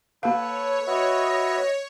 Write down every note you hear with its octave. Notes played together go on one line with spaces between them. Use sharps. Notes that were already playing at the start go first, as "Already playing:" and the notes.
A#3 A4 B4 C#5 F5
F#4 B4 D#5 E5 D#6